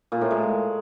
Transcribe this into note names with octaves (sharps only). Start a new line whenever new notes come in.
A#2
A2
G#3